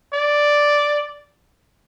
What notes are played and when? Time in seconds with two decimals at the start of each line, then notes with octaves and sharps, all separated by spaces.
0.14 D5